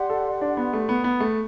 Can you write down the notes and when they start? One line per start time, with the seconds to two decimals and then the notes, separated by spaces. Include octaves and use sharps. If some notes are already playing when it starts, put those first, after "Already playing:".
Already playing: G4 D5 F#5 C6
0.10 A4
0.41 D4
0.57 B3
0.73 A3
0.89 B3
1.04 B3
1.20 A3